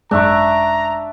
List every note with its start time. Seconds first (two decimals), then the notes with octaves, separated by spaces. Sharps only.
0.11 G#1 F#2 G#3 D4 E5 A#5 C#6